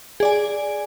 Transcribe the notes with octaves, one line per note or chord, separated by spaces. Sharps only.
G#4 D5 G#5